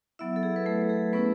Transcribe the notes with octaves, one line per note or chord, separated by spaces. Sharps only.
F#3 B3 E4 E5
A4
G#4
B4
A3 A4
G#4
A3 B3 C#4 E4 B4